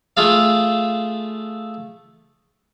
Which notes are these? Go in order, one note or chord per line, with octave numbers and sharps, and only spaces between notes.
A3 F4 G#4 A4 F5